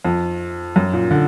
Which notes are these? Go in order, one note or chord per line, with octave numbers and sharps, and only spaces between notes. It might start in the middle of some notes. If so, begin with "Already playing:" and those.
F2
F#2
A#2
D3